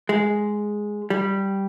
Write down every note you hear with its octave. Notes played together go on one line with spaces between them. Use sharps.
G#3
G3